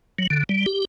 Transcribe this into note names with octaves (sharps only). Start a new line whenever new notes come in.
F#3
D3
G3
G4